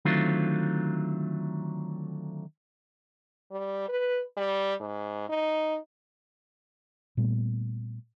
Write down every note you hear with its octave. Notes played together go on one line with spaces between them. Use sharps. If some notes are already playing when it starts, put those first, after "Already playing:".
D3 D#3 F#3 A3 C4 F4
G3
B4
G3
G#2
D#4
A#2 G3 A3 B3